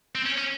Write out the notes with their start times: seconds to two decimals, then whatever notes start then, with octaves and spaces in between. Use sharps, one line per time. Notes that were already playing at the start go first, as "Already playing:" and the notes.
0.15 C4
0.26 C#4
0.38 C#4